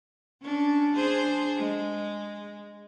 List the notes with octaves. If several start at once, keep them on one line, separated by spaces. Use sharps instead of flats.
C#4 D4
D4 G#4 C5
G#3